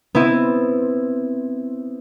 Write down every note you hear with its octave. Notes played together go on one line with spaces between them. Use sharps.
B3 C4 E4